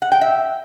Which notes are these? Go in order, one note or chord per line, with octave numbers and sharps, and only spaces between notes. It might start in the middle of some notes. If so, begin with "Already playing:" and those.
F#5
G5
E5